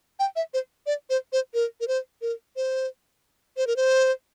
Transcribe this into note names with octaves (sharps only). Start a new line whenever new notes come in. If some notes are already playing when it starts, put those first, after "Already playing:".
G5
E5
C5
D5
C5
C5
A#4
A#4
C5
A#4
C5
C5
A#4
C5